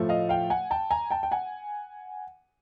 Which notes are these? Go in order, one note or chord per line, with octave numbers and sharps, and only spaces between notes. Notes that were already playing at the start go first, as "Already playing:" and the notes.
Already playing: A2 F3 A3
D#5 F5
F5 G5
F#5 G#5
G5 A5
G#5 A#5
G5 A5
G5
F#5 G#5